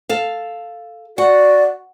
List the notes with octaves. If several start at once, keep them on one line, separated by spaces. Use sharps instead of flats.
A4 F5
F#4 D5 F#5